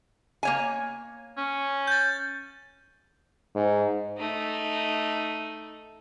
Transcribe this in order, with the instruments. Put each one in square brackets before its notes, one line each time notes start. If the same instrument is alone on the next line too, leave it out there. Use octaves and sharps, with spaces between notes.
[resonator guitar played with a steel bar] A#3 C#5 G#5
[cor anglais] C#4
[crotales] G6 A6
[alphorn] G#2
[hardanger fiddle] A3 D#4